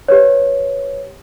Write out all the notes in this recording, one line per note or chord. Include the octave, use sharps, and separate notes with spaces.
G4 B4 C#5